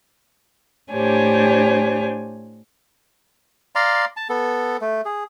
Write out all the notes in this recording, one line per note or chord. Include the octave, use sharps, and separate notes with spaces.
A2 D4 G4 C5 C#5 G#5
D5 F5 A#5 C6
A5
B3 A4
A3
G#4